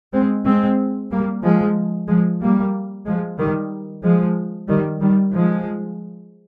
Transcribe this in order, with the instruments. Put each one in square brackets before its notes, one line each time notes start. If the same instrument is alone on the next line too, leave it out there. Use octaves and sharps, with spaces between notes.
[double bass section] G#3 C4
G#3 C4
G3 A#3
F3 G#3
F3 G#3
G3 A#3
F3 G#3
D#3 G3
F3 G#3
D#3 G3
D#3 G3
F3 G#3